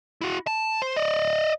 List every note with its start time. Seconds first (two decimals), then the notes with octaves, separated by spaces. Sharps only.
0.21 E4 F#4
0.47 A5
0.82 C5
0.96 D5 D#5